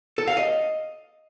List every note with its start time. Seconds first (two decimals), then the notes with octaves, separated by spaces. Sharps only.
0.18 A4
0.27 F5
0.37 D#5